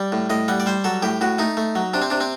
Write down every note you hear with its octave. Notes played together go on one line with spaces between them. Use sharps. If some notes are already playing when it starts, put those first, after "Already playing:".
Already playing: G3 D5
A2
A2 D#5
G3 F#5
D5
G3 C5
F#3 A4
A2 G4
A2 F#4
A3 D#4
A3
F#3
C3 D4
C4
C3 D4
C4